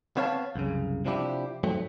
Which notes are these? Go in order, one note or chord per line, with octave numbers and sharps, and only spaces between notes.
B3 C4 C#5 F5 F#5 A5
C2 F#2 C#3
C3 F3 D4 E4 G4
G#2 F#3 A3 C4